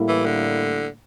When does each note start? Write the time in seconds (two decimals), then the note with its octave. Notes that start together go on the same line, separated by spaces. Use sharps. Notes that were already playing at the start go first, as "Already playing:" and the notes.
Already playing: A2 G3 A#3 E4
0.08 E3
0.25 D3